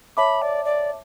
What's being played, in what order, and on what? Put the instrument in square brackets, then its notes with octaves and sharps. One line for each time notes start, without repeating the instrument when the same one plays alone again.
[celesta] C#5 E5 A5 D6 [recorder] B5
[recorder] D5
D5